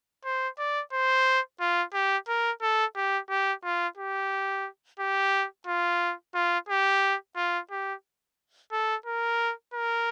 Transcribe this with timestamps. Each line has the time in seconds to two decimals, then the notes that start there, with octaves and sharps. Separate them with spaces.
0.25 C5
0.58 D5
0.93 C5
1.60 F4
1.94 G4
2.28 A#4
2.62 A4
2.96 G4
3.30 G4
3.64 F4
3.98 G4
4.99 G4
5.67 F4
6.35 F4
6.69 G4
7.36 F4
7.71 G4
8.72 A4
9.06 A#4
9.74 A#4